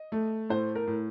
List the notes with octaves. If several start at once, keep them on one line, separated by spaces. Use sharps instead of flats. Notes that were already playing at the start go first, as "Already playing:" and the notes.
Already playing: D#5
A3
A2 C5
A#4
A2